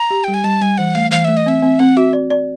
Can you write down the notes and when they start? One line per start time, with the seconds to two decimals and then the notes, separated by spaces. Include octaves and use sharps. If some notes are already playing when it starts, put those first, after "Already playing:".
Already playing: A#5
0.10 G4
0.24 G3 G5
0.34 G#5
0.44 G3 A5
0.61 G3 G#5
0.78 E3 F#5
0.95 A3 F5
1.11 E3 F5
1.25 A3 E5
1.37 D#5
1.46 C4 E5
1.62 C4
1.79 C4 F#5
1.97 F#4 E5
2.13 D5
2.30 D5